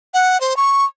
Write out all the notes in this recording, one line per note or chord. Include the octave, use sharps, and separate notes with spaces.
F#5
C5
C#6